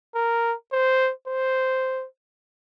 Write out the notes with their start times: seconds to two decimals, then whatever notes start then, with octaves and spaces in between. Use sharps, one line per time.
0.15 A#4
0.72 C5
1.27 C5